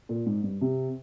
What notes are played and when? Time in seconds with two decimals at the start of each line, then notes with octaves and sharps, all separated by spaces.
0.09 A#2
0.26 G#2
0.44 G2
0.61 C3